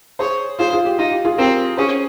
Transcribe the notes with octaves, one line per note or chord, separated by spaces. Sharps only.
G#4 C5 C#5
F4 G#4 C5
F4 G#4
G4
D#4 F4
G4
F4 G#4
C4 G4 A#4
C#4 G#4 C5